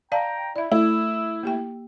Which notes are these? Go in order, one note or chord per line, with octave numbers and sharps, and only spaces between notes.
D5 F5 G5 A5 A#5
E4 D5 E5
A3 E4 E6
A#3 G4 G5